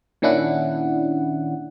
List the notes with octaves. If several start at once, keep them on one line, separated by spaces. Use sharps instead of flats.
A#2 D#3 C#4 D4 E4 F#5